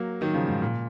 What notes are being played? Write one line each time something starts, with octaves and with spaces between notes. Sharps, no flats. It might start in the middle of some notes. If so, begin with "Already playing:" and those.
Already playing: F#3 A#3
D#3 F#3
C#3 F3
G#2
A#2